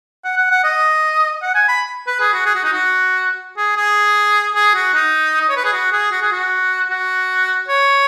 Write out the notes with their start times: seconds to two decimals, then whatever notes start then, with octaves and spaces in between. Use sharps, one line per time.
0.24 F#5
0.37 F#5
0.50 F#5
0.64 D#5
1.42 F#5
1.55 G#5
1.68 B5
2.07 B4
2.20 G#4
2.33 F#4
2.46 G#4
2.55 F#4
2.64 D#4
2.73 F#4
3.57 G#4
3.77 G#4
4.55 G#4
4.75 F#4
4.94 D#4
5.41 D#5
5.49 C#5
5.56 B4
5.64 G#4
5.73 F#4
5.92 G#4
6.12 F#4
6.22 G#4
6.32 F#4
6.90 F#4
7.68 C#5